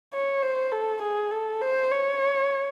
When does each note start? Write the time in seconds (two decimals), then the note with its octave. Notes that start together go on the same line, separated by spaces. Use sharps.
0.14 C#5
0.43 C5
0.72 A4
1.02 G#4
1.31 A4
1.61 C5
1.91 C#5